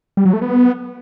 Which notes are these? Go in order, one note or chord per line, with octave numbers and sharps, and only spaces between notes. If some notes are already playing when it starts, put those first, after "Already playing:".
G3
F#3
A3
B3